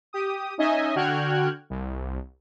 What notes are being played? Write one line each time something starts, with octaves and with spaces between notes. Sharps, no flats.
G4 D#6
C#4 D#4 D#5 E5 G#5
D3 F#4 G5 F6 F#6 G#6
C2